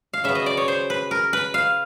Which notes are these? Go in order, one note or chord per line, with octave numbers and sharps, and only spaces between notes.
F5
C#3 F#3 B3 E5
D#5
D5
C#5
C5
B4
A#4
B4
F5